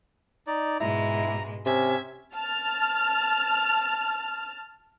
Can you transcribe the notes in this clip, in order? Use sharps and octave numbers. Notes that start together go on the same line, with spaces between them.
D#4 D5
G#2 B2 G#3 E4 A#5
C3 C#4 E5 G#6
A5 F6